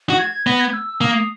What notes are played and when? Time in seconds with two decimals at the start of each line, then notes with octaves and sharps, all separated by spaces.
0.10 F#4
0.19 G#6
0.46 B3 A#6
0.60 G#6
0.73 E6
0.87 E6
1.01 A#3 D#6